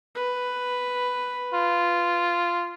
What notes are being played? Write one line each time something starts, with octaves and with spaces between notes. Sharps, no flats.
B4
F4